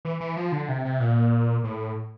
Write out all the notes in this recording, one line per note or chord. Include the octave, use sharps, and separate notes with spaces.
E3
E3
F3
D3
C3
C3
A#2
A2